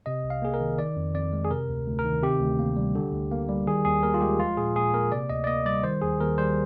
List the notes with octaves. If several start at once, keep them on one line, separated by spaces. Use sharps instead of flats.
C3 D#5
C2
F5
A#3 G#4
A#4
D#3
D#3 D5
F2
F2 D5
G#3
G#4
C3 A#4
D2
D2
A#4
D#3
C3 G4
D2
A#3
G3
D3
D2
A#3
G3
D#3 G#4
D#2 G#4
D#2 A#4
F4
G#3 G4
F3 F4
A#2 G#4
A#2 G#4
A#3 A#4
C3 D5
D2 D#5
D5
A#3 D#5
G3 D5
D#3 C5
D#2 G#4
D#2 A#4
G3 C5